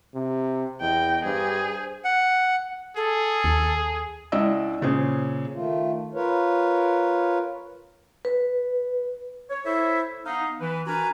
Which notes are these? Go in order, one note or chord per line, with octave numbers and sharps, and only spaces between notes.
C3
E2 D#5 G5
G2 G#4 C5
F#5
G#4 A4
D#2
C#2 D4 E4 D5 D#5 E6
A#2 C#3 C#4 G#4 C5
D#3 A3 F4
F4 A#4 B4 C#5
B4
C#5
E4 A4 C5 C#5 E5
B3 D#4 F5
E3 B4
D4 F#4 A#4 B4 G#5 A#5